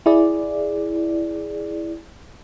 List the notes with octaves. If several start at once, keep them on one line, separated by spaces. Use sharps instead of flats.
E4 G#4 D5